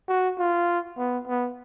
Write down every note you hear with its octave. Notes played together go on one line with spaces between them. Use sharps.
F#4
F4
B3
B3